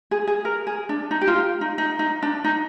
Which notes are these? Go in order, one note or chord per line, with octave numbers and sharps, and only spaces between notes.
G#4
G#4
A#4
G#4
D4
D#4
G4
F4
D#4
D#4
D#4
D4
D#4